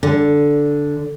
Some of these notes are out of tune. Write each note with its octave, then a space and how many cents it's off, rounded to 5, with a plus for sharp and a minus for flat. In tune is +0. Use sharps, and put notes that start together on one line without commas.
D3 -5